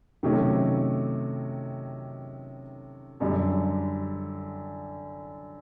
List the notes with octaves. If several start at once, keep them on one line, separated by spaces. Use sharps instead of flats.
C3 D#3 F#3 A3 C#4
F#2 D3 G3